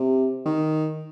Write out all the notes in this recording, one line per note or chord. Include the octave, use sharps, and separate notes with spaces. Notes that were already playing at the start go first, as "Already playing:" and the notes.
Already playing: C3
D#3